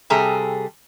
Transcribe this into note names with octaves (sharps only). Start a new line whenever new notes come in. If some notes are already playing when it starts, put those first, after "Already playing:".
C3 G3 G#4 A4 A#5